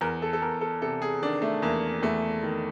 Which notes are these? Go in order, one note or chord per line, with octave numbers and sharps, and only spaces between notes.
E2 A#4
A4
A4
E2 A#4
A4
C3 A4
G#4
D#3 D4
A3
E2 A#3
E2 A3
D#3